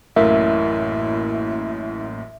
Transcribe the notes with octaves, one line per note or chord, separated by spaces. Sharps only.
A1 F#2 A2 A#3 E4 E5